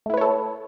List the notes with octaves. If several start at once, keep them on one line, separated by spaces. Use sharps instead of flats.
A3 E4 A4 B4 C#5